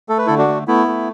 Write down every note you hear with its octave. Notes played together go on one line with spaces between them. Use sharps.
A3 A4
B4
D3 E4 A4
D4 F#4
A3
A3 B3 E4
A3